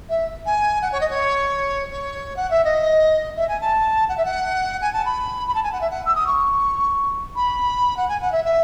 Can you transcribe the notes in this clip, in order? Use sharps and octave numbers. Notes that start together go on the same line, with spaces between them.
E5
G#5
F#5
C#5
D#5
C#5
C#5
F#5
E5
D#5
E5
G#5
A5
F#5
E5
F#5
G#5
A5
B5
B5
A5
G#5
F#5
E5
F#5
E6
D#6
C#6
B5
F#5
G#5
F#5
E5
E5